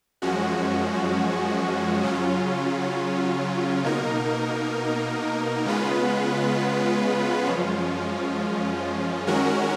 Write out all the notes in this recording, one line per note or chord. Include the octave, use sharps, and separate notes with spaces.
F#2 F3 G#3 C#4 F#4
C#3 F#3 C#4 F4
B2 A#3 D#4 A#4
C#3 G#3 B3 F4 B4
F#2 F3 G#3 C#4 F4
D#3 G#3 C#4 F#4 A#4